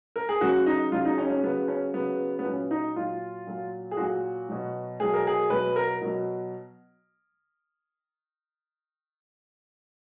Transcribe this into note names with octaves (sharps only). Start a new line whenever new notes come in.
A#4
G#4
C#3 F#3 F#4
D#4
C#3 F#3 F4
D#4
C#4
C#4
C#3 F#3 B3
C#4
C#3 F#3 B3
B3
A#2 F#3 C#4
D#4
A#2 F#3 F4
A#2 F#3
G#4
A#2 F#3 F#4
B2 F#3
B2 F#3 G#4
A#4
G#4
B2 F#3 B4
A#4
B2 F#3